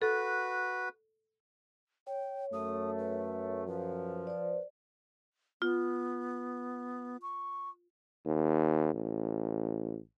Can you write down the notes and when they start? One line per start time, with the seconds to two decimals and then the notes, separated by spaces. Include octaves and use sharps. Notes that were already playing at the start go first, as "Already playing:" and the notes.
0.02 F#4 A4 B4
2.07 C#5 G5
2.53 F#2 A3 D#6
2.98 B4
3.67 F3 B4
4.27 C5 D5
5.62 B3 F4
7.22 C#6
8.26 D#2
8.94 A1